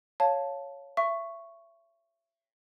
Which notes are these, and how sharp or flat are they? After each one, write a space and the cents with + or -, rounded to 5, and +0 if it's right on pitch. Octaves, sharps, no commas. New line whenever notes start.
C#5 +0 F5 +0 A5 +0
E5 +30 C#6 +0